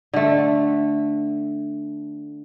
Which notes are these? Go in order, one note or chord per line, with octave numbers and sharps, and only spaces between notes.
D3 A3